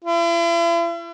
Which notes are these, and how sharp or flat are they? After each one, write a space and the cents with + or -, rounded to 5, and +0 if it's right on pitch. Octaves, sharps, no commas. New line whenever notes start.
E4 +45